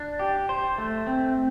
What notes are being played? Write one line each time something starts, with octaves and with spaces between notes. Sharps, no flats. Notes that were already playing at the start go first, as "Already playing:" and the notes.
Already playing: D4
G4
C5
A3
C4